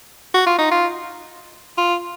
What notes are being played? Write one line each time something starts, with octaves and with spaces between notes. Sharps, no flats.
F#4
F4
D#4
F4
F4